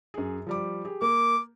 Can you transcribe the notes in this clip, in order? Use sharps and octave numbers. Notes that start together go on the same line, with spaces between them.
F#2 G#4
F3 G3 D6
G4 G#4
A#3 D6